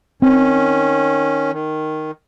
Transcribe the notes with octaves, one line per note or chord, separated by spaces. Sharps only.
D#3 C4 C#4
D#3